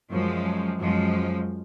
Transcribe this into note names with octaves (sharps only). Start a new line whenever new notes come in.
F#2 F3 G#3
F#2 F3 G#3